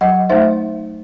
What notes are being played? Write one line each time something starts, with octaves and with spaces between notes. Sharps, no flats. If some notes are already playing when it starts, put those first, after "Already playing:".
F#3 D#5 F#5
A3 D#4 C5 E5